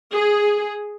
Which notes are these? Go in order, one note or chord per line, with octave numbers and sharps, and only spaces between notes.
G#4